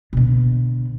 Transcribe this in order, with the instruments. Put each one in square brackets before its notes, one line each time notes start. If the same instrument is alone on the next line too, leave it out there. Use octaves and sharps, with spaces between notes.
[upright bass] B2 D3